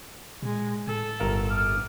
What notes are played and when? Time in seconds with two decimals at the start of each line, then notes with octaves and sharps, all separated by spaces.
0.42 A#2 G#3
0.87 A2 A4
1.20 G1 A#4 F5
1.50 D6 D#6 F6